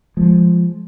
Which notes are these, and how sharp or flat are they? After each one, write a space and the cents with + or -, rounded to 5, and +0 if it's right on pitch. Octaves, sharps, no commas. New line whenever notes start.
F3 -5 G#3 +0